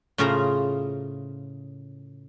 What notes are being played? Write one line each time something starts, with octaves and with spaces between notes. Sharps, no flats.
A2 C#3 F4 G#4 C5 A#5